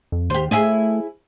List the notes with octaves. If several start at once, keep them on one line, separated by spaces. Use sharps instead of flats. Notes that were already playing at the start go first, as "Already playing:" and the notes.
F2
D#2 G4 C5
A3 E4 G#4 D#5